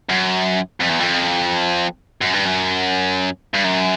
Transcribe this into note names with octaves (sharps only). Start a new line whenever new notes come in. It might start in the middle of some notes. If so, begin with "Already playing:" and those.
F#2
F2
E2
F2
F#2
G2
F#2
G2
F#2